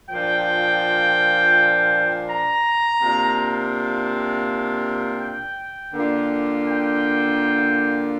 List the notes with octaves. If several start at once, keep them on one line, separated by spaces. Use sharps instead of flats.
A#2 F3 D4 F4 G5
A#5
C3 A#3 D4 F4
G5
D3 A#3 D4 F4
G5